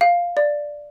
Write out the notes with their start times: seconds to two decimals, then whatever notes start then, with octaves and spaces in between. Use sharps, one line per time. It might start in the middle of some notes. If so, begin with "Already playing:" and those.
0.01 F5
0.37 D5